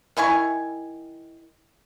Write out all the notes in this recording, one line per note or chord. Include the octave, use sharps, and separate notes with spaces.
D#3 E4 G#5 C#6